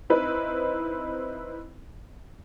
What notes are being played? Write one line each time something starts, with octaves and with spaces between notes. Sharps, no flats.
C4 D#4 E4 B4